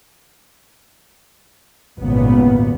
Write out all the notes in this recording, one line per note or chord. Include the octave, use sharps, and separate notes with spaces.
G#1 D#2 A#2 C#3 B3